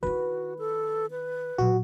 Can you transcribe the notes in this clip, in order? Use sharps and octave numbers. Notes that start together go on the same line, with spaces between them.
D#3 E4 F#4 B4
A4
B4
A#2 F#3 F#4